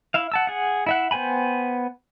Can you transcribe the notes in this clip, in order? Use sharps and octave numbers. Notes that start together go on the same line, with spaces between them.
E4 E5 F5
F#5 A5 E6
G#4 F#5
E4 E5 F#5
B3 C5 G5 G#5 B5